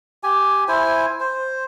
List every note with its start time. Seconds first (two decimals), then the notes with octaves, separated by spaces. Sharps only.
0.23 G4 G#5
0.68 E4 C5 G#5
1.20 C5